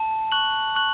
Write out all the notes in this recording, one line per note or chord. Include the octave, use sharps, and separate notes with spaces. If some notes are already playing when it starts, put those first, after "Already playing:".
Already playing: A5
C#6 F#6 F#7
C#6 F#6 F#7